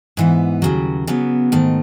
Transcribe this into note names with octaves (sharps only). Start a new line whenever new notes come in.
G#2 E3 B3
D#2 C#3 F#3
C#3 F#3 B3
G#2 D#3 A3